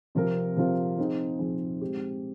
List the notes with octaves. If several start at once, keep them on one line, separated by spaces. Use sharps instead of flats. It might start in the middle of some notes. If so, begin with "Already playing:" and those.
C3 F3 C4 F4 A#4
C3 F3 C4 F4 A#4
F3 C4 D#4 G#4
F3 C4 D#4 G#4
G#3 C4 G4